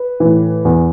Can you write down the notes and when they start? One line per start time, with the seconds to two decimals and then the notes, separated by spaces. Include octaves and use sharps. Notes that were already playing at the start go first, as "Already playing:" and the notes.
Already playing: B4
0.20 A2 E3
0.65 E2